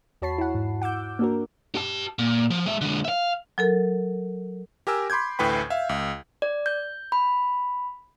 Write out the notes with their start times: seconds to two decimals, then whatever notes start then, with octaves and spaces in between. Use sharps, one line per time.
0.22 E2 F#4 C#5 A5 B5 C7
0.38 E4 F#5
0.55 G#2
0.82 F#5 D6 E6 G6
1.19 A#3 D4 F#4 A#4
1.75 G4 A5
2.19 A#2
2.50 F3
2.66 G#3 E5
2.81 D3 G#3
3.05 E5 F5
3.58 F#3 A4 A#4
4.87 G4 A#4 G#5 E6
5.10 B5 C6 D6 G6 G#6
5.39 A1 D2 A2 B4 G5 B5
5.70 E5 F5
5.89 C#2
6.42 D5
6.66 G6
7.12 B5